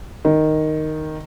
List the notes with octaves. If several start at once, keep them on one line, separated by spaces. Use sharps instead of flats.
D#3